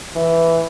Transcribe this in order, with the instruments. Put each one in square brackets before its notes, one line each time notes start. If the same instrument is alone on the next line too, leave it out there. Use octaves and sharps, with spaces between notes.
[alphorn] E3